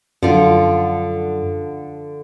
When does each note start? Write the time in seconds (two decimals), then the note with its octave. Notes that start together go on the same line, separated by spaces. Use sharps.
0.23 F#2 D3 F3